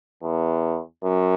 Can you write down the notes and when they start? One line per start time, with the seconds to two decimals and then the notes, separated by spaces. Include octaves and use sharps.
0.22 E2
1.04 F#2